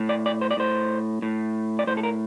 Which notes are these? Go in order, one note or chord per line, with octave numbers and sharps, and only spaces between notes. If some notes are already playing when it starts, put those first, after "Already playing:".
Already playing: A2
D5
D5
C5
D5
A2 C5
A2
D5
A2 C5
A4
A#4